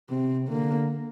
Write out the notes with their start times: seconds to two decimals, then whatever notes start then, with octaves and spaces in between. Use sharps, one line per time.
0.10 C3 C4
0.49 D3 A#3